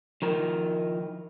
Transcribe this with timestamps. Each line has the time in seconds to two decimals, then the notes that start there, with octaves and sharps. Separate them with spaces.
0.22 D#3 F3 A#4